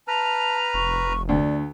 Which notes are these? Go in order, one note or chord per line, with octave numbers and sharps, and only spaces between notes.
B4 A5 A#5 F6
F1 C#6
D2 D5